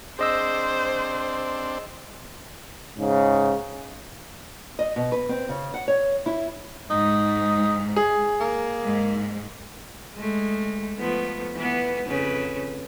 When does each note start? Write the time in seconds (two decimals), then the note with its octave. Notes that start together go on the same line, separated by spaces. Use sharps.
0.19 C4 D4 G#4 C5 D#5 E6
2.98 G#2 C#3
4.79 D#5
4.96 B2
5.12 B4
5.29 C4
5.49 C#3
5.74 F#5
5.88 C#5
6.26 E4
6.90 G#2 D#4
7.96 G#4
8.40 A#3
8.83 G#2
10.14 G#3 A3
10.99 F3 A3 B3
11.55 E3 B3
12.09 F2 C#3 B4